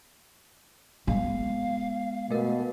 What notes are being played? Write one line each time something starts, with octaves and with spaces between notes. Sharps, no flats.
G#3 B3 F5
B2 A3 A#4